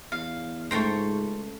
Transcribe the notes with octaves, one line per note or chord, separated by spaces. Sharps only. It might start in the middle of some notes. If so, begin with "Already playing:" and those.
E2 F5
C#2 G#2 A3 C5 G5 A#5 C#6